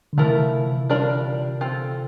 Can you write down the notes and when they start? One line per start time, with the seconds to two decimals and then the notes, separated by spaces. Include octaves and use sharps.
0.13 D3
0.18 C3 E3 F3 A3 E4 A#4
0.90 G3 D4 F4 A#4 D5
1.61 C4 F4 A4